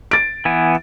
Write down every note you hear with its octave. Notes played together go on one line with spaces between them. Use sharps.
A6 D7
E3 B3 G#5